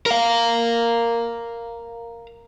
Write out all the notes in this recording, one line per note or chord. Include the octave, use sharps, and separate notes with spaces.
A#4 F5